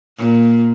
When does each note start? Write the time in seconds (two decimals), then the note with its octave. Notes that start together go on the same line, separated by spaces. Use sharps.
0.18 A#2